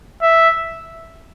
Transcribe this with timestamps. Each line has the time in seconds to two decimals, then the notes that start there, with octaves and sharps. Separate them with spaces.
0.22 E5